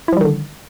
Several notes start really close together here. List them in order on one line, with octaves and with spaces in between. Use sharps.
E4 F3 G3 D#3 D3